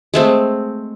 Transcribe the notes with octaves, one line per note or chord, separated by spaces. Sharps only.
G#3 A3 C4